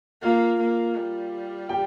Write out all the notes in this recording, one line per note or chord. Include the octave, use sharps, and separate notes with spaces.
A#3 F4 F5
A#3
G3
G4 G5